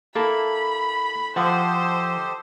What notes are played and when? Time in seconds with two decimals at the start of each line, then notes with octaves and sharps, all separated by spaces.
0.15 A#3 E4 A4 B5
1.36 F3 G4 A4 C5 D#5 F#5